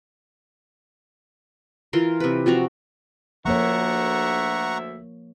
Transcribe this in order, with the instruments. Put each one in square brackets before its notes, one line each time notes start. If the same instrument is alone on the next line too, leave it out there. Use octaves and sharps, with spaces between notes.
[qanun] E3 F4 A#4 C6
C3 B4
F3 C4 F#4 A#5
[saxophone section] D2 E5 [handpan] F3 A#3 C#5 [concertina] F#5 A#5 C#6